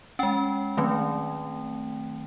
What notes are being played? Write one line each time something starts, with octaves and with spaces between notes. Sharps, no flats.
G#3 C#4 G5
D#3 F#3 A3 C4